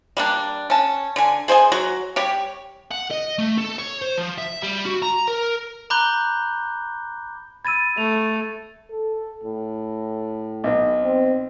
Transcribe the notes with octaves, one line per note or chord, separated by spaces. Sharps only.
G3 A#3 D4
C#4 A5
D3 G#5
G#4 C5 D#5 G#5
F#3 F#4
G3 G4 C#5
F#5
D#5
A3
A4
C#5
C5
F3
E5
G3
F#4
A#5
A#4
A#5 B5 D6 F#6 G6 G7
B5 E6 G#6 A6 D#7
A3 F7
A4
A2
B1 B3
C4